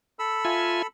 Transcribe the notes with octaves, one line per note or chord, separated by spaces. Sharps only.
A4 B5 E6
F4 E5 G#5